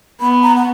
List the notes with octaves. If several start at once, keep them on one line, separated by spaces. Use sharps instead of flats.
B3 B5
A#5
F#5